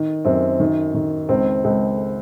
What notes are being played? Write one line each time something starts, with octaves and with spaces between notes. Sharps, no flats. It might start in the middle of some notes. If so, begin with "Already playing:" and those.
Already playing: D#3
F#2 C4
D#3
D#3
C#2 C4
C#2